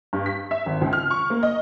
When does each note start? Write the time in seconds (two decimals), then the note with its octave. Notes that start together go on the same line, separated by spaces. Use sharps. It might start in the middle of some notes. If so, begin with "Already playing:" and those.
0.13 G2
0.26 B6
0.51 E5
0.66 G#1
0.81 C#2
0.93 F6
1.10 C#6
1.30 A#3
1.43 D#5